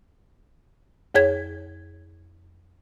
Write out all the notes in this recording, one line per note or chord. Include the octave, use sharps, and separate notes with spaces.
F2 G#4 C#5 G#6